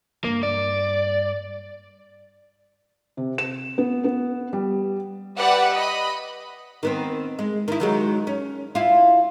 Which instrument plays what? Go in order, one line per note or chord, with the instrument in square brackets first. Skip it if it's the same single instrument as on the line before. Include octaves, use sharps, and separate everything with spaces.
[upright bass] G2 [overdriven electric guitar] A#3
[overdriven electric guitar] D5
[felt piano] C3
E7
B3
B3
G3
[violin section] G4 B4 D5 E5 F#5
D#5 B5
[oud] D#3 B3 C4
G#3
D#3 E4
D#3 F#3 G#3
C#4
E4 F4